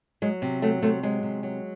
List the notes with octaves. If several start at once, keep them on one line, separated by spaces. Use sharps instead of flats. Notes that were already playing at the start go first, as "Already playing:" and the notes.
F#3 G#3
C3
F#3 A3
C3 A3
F#3 G#3
C3
F#3